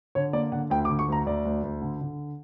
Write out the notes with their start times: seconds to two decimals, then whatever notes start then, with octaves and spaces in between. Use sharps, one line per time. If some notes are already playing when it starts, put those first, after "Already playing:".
0.15 D3 C#5
0.33 A#3 D5
0.52 D3 F#5
0.70 D2 G5
0.85 D6
0.89 D3
0.99 C#6
1.08 D2 A#5
1.26 D2 D5
1.45 D2
1.63 D2
1.82 D3
2.01 D3